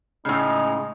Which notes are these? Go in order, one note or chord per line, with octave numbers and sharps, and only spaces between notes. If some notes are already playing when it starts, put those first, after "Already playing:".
A2 C#3 G#3 D#4